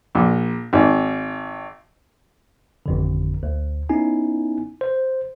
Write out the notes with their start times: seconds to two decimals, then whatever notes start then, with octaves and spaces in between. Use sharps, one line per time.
0.15 A#1
0.73 G#1
2.86 G#1 F2 D3
3.43 D2
3.89 B3 C#4 D#4 E4 G#5
4.81 C5